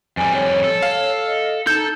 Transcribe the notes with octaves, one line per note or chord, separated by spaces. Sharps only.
F2 G3 G#5
C#5
A4
F5
D#5
D#4 A4 A5 G6